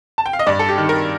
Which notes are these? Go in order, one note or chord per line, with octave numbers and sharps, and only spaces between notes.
A5
G5
F5
D#5
G2 D5
A4
G4
D#3
A#4